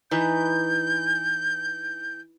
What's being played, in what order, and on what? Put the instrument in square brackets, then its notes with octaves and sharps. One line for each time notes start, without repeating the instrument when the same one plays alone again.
[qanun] E3 D#4 B4 [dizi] G6